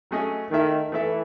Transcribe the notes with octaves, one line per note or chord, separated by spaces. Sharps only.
F#3 A3 C#4 G#4 D#5
D#3 A3 E4 A4 E5
E3 A3 E4 A4 E5